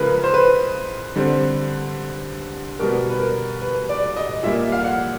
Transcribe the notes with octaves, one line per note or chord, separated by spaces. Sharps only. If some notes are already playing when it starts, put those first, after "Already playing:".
Already playing: C#3 F3 G#3 A#4 B4
C5
B4
D3 G3 C4
B2 G3 B3 A#4
B4
A#4
B4
D5
D#5
A#2 G3 A#3 E5
F5
F#5